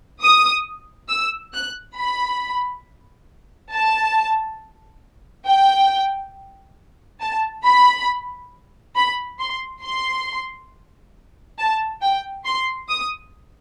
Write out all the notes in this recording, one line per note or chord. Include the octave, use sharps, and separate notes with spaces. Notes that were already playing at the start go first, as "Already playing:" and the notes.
D#6
E6
F#6
B5
A5
G5
A5
B5
B5
C6
C6
A5
G5
C6
D#6